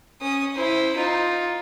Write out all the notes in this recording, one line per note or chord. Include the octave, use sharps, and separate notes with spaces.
C#4 D#6
E4 C5
D#4 F4